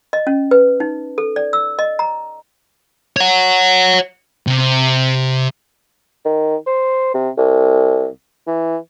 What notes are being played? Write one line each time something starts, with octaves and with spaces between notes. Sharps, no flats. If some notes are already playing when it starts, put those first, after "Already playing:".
D#5
C#4
B4
D#4
A4
D5
E6
D#5
A#5
C#5 F#5
C3
D#3
C5
C3
C2
E3